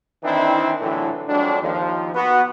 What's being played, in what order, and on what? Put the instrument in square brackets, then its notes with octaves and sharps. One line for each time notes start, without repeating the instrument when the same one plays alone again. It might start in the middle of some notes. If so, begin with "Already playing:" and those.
[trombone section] D#3 E3 C4 D4 E4
A#1 A2 D3 E3 F#3
F2 F#3 G#3 D4
D#2 F3
B3 F#4